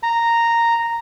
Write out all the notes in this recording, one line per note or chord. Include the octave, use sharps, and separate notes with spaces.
A#5